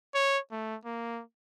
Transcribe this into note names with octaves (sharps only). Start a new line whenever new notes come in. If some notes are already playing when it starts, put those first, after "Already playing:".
C#5
A3
A#3